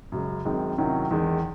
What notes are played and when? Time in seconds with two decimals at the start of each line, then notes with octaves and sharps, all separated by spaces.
0.12 F#2 C#3 G#3
0.45 F#2 D#3 G#3 C4
0.78 C3 D#3 F#3 C#4 E4
1.11 E2 D#3 G#3